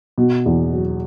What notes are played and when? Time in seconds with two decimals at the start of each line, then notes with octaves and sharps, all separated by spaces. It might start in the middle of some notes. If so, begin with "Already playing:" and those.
0.18 B2
0.46 E2
0.73 F#3